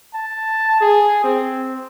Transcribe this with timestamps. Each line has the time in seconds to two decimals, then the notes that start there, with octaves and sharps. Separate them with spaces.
0.14 A5
0.81 G#4
1.24 C4